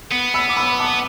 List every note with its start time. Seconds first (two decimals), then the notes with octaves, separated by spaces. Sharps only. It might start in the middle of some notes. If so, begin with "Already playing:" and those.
0.12 B3
0.34 B5 E6
0.49 D6
0.57 B5 E6
0.79 A5 D6